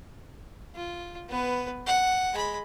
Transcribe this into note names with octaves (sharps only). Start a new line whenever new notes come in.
F4
B3 B4
F#5
G#3 B5